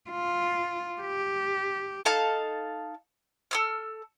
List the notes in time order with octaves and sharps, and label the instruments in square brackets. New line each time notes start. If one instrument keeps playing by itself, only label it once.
[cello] F4
G4
[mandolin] D#4 A4 F5 A5
A4 E6 F6